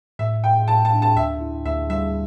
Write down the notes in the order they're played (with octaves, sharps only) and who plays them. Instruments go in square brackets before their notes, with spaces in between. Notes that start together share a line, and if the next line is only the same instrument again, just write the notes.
[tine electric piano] A2 [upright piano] E5
[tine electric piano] A2 [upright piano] G5
[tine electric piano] A2 [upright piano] A5
[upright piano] A5
[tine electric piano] D4
[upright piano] A5
[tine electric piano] D2 [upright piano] E5
[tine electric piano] E4
[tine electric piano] D2 [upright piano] E5
[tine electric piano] G3 [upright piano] E5